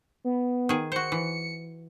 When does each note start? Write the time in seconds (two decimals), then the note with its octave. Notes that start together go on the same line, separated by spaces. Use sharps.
0.24 B3
0.69 D#3 G#4
0.92 F#4 C5 C#7
1.12 E3